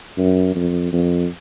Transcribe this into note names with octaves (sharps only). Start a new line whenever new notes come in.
F#2
F2
F2